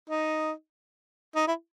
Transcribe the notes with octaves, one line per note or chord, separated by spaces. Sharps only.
D#4
D#4
E4